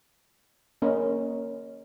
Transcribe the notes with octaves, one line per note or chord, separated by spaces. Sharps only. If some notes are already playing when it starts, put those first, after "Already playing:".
A#3 C#4 A#4 D#5